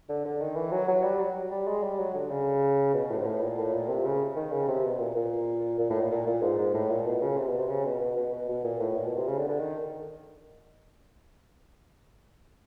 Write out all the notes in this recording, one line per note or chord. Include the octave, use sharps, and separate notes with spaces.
D3
D3
D#3
E3
F#3
F#3
G3
F#3
G3
G#3
G3
F#3
D3
C#3
B2
A2
G#2
A2
A#2
A2
A#2
C3
C#3
D#3
C#3
C3
B2
A#2
A#2
A#2
A2
A#2
A#2
A#2
G#2
G#2
A2
A#2
B2
C#3
C3
B2
C3
C#3
B2
B2
B2
B2
B2
A#2
A2
A#2
B2
C3
C#3
D3
D3
D#3